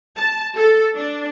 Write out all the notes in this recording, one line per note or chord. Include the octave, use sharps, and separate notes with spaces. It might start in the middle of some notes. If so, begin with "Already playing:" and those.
A5
A4
D4